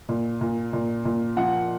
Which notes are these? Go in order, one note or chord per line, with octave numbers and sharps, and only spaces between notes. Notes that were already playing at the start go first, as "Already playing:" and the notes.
A#2
A#2
A#2
A#2
F3 F#5